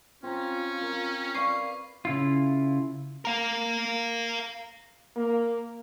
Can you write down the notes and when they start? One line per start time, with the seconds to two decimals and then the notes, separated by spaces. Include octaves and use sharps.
0.23 C4 C#4 F4 A#5
0.81 A#4 A#5
1.35 B4 D5 F5 C#6 C7
2.05 C#3 E4 F4
3.25 A#4 F5
5.16 A#3